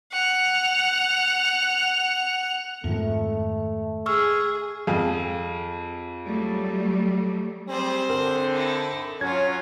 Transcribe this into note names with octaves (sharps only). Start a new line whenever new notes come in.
F#5 F7
F2 G#2 D#3 A3
G#4 C#6 E6 F6
F2 G#4 F5
F#3 G3 A3
G3 C4 G#4 C5
D3 A#4
D#4 E4
F#3 C#4 F4 F#4 G#6